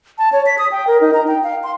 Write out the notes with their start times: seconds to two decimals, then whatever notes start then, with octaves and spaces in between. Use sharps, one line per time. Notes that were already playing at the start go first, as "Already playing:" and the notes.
0.18 A5
0.32 C#5
0.46 B6
0.58 D#6
0.72 G5
0.87 A#4
1.01 D#4
1.14 A#5
1.28 G5
1.44 F5
1.64 C6